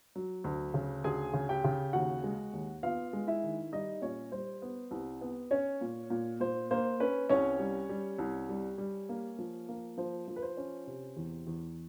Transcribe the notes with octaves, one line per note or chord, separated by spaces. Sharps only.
F#3
D2
C#3
D2 G#4 G#5
C#3
G4 G5
C#3
D#2 F#4 F#5
G#3
D#2
B3 F4 F5
G#3
E4 E5
D#3
G3 D#4 D#5
A#2 C#4 C#5
G3 C5
B3
C2
B3
C#4 C#5
A#2
A#2
A#2 C5
A#3 C5
C#4 B4
C2 C#4 C#5
G3
G3
C2
G3
G3
A#3
F3
A#3
F3 C5
F3
B4
C5
C#4
C3
E2
E2